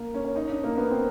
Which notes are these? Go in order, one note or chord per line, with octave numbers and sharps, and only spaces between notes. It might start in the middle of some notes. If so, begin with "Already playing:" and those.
Already playing: A#3
C#4
C#4
D#4
D4
A#3
B3
C4